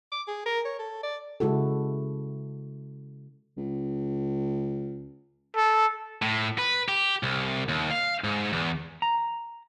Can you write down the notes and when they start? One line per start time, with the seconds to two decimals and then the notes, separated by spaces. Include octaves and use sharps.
0.12 D6
0.28 G#4
0.46 A#4
0.65 C#5
0.79 A4
1.03 D5
1.40 C#3 G#3 E4 F#4 A4
3.57 C#2
5.56 A4
6.22 A2
6.58 B4
6.88 G4
7.23 C2
7.69 D#2
7.91 F5
8.24 G#2
8.53 E2
9.02 A#5